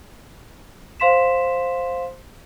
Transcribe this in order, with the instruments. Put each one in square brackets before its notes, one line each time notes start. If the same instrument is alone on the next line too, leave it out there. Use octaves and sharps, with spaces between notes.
[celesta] C5 F5 C6 B6 E7